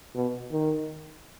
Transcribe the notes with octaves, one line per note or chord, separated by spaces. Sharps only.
B2
D#3